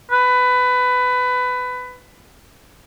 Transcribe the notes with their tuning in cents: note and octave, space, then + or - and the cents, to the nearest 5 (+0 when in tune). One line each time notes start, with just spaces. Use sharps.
B4 +20